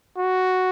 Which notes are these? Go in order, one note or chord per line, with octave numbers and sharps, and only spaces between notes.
F#4